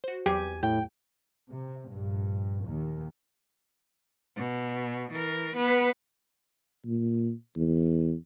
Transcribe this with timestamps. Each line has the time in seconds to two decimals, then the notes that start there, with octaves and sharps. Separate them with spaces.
0.04 F#4 C5
0.26 E2 F#3 G4 G#5
0.63 A2 G5
1.51 C3
1.88 A#1 G2
2.66 D#2
4.37 B2
5.12 E3 A#4
5.56 B3 B4
6.85 A#2
7.56 E2